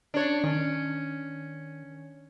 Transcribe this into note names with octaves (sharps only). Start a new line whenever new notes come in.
D4 C#5
D#3 C#4